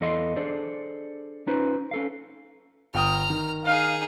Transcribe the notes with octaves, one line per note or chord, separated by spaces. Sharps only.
E2 E3 A4 D#5 F5 C6
D4 G#4 A4 C5 D5
C#4 D#4 F4 B4 C5
C#4 A4 F5
G1 G5 A#5 D#6 F6
D#3
D#4 G#4 F5